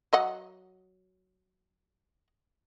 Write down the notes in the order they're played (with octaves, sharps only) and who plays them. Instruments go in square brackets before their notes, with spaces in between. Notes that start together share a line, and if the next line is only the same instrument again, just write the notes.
[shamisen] F#3 D#5 F#5